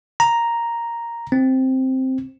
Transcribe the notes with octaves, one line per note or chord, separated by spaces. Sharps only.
A#5
C4